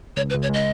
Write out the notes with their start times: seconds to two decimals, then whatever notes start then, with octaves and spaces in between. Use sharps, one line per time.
0.17 C#2 C#5
0.30 B4
0.34 C#2
0.42 C#5
0.49 G#3 D#5